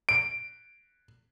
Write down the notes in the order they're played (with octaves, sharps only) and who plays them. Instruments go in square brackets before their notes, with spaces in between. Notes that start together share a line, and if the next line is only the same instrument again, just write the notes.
[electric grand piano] D7